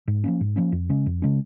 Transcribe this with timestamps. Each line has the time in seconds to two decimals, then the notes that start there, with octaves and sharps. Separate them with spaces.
0.08 G#2
0.24 F3 A#3 C#4
0.41 G#2
0.56 F3 A#3 C#4
0.72 F2
0.89 C#3 G#3 C#4
1.06 F2
1.22 C#3 G#3 C#4